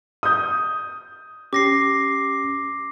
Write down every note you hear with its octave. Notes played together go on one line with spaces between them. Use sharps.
D#6 G6
C#4 G4 D6 A#6 C7